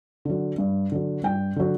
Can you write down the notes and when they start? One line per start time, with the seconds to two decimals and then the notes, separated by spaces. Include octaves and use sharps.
0.25 D3 F#3
0.58 G2
0.92 D3 F#3
1.24 G2 G5
1.56 D3 F#3